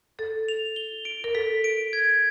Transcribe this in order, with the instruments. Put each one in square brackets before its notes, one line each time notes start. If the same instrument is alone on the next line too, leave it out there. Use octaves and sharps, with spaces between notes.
[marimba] A4 [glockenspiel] A6
[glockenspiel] F7
G7
D7
[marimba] A#4
[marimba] A4 [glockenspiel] B6
[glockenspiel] D7
G#6